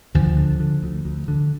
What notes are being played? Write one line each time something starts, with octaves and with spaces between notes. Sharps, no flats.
D2 D3 F3
D3
D3
D2
D2
D3